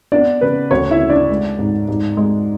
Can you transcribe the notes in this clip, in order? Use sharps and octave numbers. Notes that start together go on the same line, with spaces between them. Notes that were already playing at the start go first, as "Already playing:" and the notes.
B3 D4 D5
C#3 B4
D2 C#5
E4 E5
C#3
D4 D5
G#3
G#2
G#2
G#3